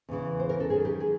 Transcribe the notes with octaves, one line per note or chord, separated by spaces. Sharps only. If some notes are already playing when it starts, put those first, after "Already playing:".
E2 C#3 E3
C5
A#4
A4
F#2 D#3 G#4
G4
G#4